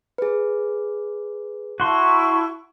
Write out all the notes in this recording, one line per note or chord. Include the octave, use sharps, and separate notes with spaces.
G#4 B4
E4 F#4 A5 C6 C#6